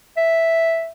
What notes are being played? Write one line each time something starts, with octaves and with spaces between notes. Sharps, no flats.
E5